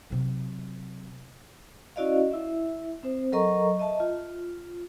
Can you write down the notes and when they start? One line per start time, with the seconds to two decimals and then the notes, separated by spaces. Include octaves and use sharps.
0.10 C3 F#3
1.96 C#4 E4 F#4 D5 D#5 F5
2.31 E4 E5
3.03 C4 C5
3.32 F#3 A4 A#4 D#5 A#5 C#6
3.79 D#5 E5 A5
4.00 F4